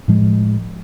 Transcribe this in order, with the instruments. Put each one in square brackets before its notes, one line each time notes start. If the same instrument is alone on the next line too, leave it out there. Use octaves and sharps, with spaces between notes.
[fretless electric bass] A2 F3 G#3